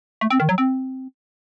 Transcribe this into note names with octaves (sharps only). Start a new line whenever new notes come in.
A3
C4
D#3
F#3
C4